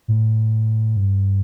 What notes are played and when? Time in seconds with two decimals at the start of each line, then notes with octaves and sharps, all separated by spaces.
0.08 A2
0.96 G2